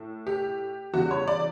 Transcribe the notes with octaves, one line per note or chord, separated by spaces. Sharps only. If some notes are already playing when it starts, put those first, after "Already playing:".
Already playing: A2
G4
E2 C#3 G3 F#4
C#5
D5